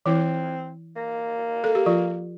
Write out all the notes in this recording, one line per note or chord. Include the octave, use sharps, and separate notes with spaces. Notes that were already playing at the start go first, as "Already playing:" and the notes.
E3 C4 E4
A#3
A4
G4
F3 F4